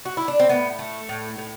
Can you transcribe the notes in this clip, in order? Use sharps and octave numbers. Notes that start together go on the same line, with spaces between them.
F#4
E4
D4
C4
A2 B3
A3
A2
A2